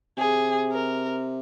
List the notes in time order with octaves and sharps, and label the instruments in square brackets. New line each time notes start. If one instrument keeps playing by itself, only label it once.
[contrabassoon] C3 [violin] G#4
[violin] A#4